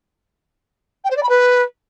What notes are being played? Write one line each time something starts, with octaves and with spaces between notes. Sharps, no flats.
G5
C5
D5
B5
B4